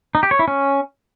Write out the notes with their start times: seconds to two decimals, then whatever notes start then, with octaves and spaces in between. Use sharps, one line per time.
0.15 D#4
0.23 G4
0.31 C#5
0.39 E4
0.48 C#4